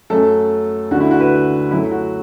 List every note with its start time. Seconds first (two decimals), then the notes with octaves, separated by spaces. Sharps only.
0.10 F#2 F#3 A3 A4
0.91 D2 D3 A3 F#4
1.00 E4
1.11 F#4
1.20 B4
1.71 F#2 F#3 A3 E4
1.91 F#4